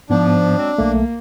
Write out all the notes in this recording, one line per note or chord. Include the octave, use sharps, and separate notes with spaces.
G#2 F3 B3 D4
F#3 G#3 C4
B1 A3 A#3